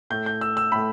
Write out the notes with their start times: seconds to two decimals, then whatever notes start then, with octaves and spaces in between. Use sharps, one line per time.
0.10 A2 A3 G6
0.26 G6
0.41 E6
0.57 E6
0.72 A2 A3 B5